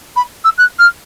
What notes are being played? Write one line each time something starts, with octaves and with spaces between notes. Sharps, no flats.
B5
E6
F#6
F6